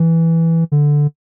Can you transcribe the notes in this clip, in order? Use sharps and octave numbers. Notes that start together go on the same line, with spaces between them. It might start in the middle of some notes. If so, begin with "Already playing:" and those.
Already playing: E3
D3